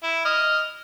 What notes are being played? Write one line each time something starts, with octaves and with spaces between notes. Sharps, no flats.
E4
D#5 F6